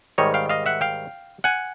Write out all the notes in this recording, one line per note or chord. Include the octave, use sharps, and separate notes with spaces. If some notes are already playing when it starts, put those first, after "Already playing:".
G#2 D#3 G3 C#5 D#5
F5 G5
D#5 F5
E5 F#5
F5 G5
F#5 G#5